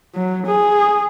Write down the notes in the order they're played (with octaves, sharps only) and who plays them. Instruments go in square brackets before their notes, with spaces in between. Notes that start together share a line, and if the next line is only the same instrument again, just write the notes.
[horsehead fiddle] F#3
G#4